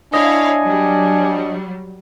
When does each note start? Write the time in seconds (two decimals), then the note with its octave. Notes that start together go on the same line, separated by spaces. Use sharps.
0.14 D4 E4 C#5 D#5 F5 G#5
0.63 F#3 G3